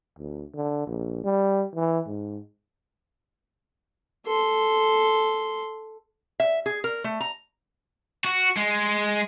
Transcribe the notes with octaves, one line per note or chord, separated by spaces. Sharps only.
D2
D3
A#1
G3
E3
G#2
A4 C6
E5
G#4
A#4
A3
A#5
F#4
G#3